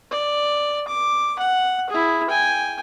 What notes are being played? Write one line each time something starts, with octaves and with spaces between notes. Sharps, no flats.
D5
D6
F#5
E4 G#4
G5 G#5